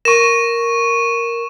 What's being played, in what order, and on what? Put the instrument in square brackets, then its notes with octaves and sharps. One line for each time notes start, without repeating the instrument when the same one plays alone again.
[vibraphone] A#4 [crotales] C#6 E7